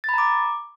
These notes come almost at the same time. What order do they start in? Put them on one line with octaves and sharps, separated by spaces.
A6 B5 A#5 D6